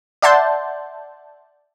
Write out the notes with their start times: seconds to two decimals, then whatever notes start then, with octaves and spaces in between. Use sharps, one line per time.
0.22 D5 E5 F#5 A5 C6 G6